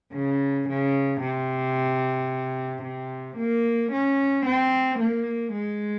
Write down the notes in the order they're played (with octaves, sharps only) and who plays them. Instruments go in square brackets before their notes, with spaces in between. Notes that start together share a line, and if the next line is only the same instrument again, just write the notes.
[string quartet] C#3
C#3
C3
C3
A#3
C#4
C4
A#3
G#3